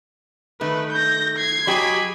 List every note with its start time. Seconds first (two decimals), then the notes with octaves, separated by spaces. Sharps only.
0.61 D#3 A3 B4
0.93 G6 A#6
1.37 G#6 C7
1.67 F#3 G4 G#4 D#5 B5